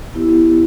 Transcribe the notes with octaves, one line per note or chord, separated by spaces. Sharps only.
B3 E4 G4